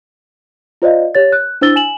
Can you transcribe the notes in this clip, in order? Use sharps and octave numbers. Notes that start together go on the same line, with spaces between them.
F4 C5 D5 D#5 F5
G4 C#5 A6
F#6
D4 E4 C5 E6 A6 G7
G#5 E7 F#7